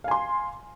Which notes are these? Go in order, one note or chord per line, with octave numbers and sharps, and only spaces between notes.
F5 G#5 C6